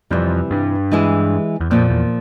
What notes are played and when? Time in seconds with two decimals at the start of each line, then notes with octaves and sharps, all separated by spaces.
0.10 F2 C3 E3 G3
0.51 G2
0.92 E3 G#3 E4 G#4
1.61 E2
1.70 F2 A#2 F3 A#3
1.90 E2